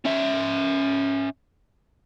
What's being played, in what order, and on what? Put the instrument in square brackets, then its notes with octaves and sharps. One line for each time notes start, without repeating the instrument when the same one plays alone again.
[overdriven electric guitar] C#4 E5